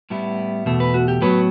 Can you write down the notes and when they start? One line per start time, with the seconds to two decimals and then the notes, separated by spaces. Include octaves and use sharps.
0.10 A2 G3 B3 E4
0.66 E2 B2 A3
0.80 B4
0.94 F#4
1.08 G4
1.21 A2 F#3 B3 B4